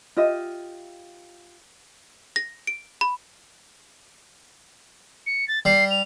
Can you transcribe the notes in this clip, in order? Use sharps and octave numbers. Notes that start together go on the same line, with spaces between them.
F4 G4 D#5 E5
A#6
D7
B5
C#7
A6
G3 C7
F7